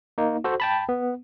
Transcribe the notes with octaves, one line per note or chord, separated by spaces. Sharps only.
A#3 D#4
F#4 A4 C5
G5 A5 B5
B3